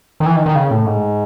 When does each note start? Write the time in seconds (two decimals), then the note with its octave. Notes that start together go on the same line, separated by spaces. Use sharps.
0.20 D#3
0.26 E3
0.36 D#3
0.46 D#3
0.56 C#3
0.71 A2
0.86 G#2